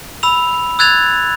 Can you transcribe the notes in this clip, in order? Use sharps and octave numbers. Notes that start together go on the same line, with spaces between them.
B5 E6 F7
E6 F#6 G#6 A6 F7